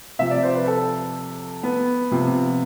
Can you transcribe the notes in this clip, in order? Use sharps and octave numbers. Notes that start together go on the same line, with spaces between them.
C3 F3 E5
D5
C5
B4
A4
B3
C3 F3